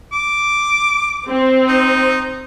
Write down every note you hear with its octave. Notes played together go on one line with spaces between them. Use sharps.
D6
C4
D#4